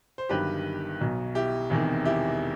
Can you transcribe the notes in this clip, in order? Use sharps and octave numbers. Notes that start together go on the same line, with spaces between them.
C5
G1 G2 D#3 F#3 G4 B4
B1 B2 F#3
E4 G4
E1 E2 C3 D#3
E4 G4